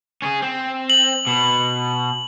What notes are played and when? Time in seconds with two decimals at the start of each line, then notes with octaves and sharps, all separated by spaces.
0.22 C#4 G#4
0.42 C4
0.90 F#7
1.27 B2